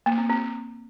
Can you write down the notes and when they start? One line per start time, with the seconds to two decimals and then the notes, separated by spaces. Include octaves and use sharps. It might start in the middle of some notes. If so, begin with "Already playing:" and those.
0.06 A#3
0.18 C4
0.29 C4